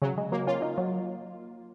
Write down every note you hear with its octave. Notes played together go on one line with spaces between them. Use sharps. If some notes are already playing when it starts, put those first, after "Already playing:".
C#3 F#3
G#3
F#3 A#3
C#4 F4
D#4
F#3